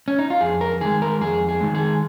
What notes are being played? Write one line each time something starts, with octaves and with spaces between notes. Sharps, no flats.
C#4
D#4
F4
F2 G#4
A#4
D#3 G#3 G#4
A#4
F2 G#4
G#4
D#3 G#3
G#4